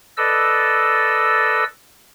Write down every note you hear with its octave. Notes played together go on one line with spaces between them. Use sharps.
A4 B4 D5 D#5 E6